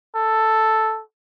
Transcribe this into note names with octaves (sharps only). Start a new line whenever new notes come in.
A4